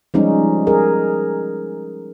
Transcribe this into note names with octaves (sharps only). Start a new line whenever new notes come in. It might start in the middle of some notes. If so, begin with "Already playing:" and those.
F3 G3 G#3 C#4 D#4
G#4 A#4